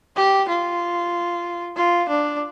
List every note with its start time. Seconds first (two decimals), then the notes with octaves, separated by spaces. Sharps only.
0.16 G4
0.48 F4
1.76 F4
2.09 D4